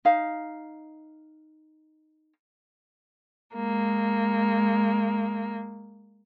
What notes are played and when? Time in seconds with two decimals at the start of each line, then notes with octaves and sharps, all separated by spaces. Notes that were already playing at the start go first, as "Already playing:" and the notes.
0.05 D#4 F5
3.53 G#3 A#3